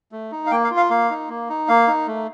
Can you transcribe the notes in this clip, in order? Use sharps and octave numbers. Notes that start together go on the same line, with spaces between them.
A3
D#4
F5
A#3 G5
F5
F4
F5
A#3 F5
D#4
A#3
D#4
A#3 F5
D#4
A3